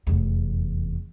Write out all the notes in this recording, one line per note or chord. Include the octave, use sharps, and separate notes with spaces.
F1 E2